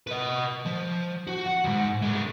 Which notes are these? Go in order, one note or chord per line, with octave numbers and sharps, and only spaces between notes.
B4 D#5
F3
F#4
F#5
E2 G#2
G#3 D4